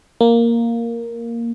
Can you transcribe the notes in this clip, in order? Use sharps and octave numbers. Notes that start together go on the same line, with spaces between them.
A#3